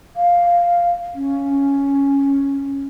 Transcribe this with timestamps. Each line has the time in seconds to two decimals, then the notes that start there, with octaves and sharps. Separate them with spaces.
0.17 F5
1.15 C#4